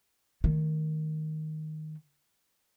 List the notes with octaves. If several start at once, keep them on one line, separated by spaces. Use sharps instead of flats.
D#3 A3